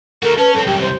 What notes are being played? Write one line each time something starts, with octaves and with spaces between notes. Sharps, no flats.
A3 F#4 A4 A#4
C#4 B4 A5
F#2 C4 A4
C2 F#2 G4 G5
C5